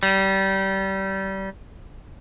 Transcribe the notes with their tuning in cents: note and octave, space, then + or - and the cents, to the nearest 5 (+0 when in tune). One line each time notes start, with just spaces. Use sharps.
G3 -25